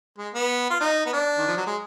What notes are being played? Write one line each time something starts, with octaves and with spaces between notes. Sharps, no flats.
G#3
B3
F4
D#4
B3
D4
D#3
F3
F#3
G#3